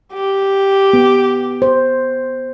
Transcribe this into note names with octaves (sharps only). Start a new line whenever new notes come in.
G4
B3
C5